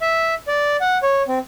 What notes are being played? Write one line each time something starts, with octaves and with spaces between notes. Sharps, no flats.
E5
D5
F#5
C#5
C4